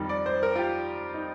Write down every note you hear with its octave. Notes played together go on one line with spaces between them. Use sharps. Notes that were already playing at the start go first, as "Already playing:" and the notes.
Already playing: F2 D#3 G3
D5
C5
A#4
F4
G4
D#4